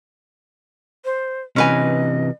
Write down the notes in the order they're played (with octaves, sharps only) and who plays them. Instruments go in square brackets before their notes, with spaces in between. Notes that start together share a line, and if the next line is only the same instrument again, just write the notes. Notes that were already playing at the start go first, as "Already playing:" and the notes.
[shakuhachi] C5
[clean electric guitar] C3 E3 [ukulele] C#4 B4 G#5 [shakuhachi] D#5